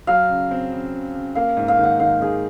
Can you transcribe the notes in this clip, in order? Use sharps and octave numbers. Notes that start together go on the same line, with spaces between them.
F#3 F5
C#3
C4
C#3
C#3
C#3
A#3 F5
G#2
F5
D#3
F#5
D#3 F5
D#3 G#4